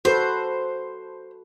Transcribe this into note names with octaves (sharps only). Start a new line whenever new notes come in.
F#4 A4 B4 C5